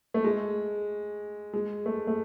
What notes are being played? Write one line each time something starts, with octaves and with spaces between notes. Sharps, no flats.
A3
G#3
G#3
A3
A3